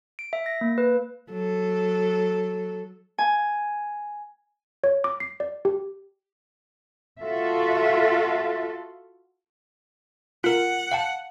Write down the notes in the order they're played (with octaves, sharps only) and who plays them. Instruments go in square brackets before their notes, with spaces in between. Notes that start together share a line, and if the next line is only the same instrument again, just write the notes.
[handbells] D7
E5
A#6
A#3
B4
[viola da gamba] F#3 A4
[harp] G#5
[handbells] C#5
D6
C7
D5
G4
[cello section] F4 F#4 A4 E5
[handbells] F4 A#4 [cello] F#5
[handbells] F5 G5 A5